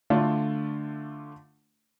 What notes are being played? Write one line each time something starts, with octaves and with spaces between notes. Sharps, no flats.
D3 A3 D4 F4